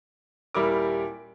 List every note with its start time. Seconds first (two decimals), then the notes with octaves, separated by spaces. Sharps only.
0.55 D#1 G3 E4 A#4 D6